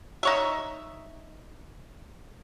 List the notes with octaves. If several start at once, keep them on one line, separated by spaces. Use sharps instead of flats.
D#4 C#5 E5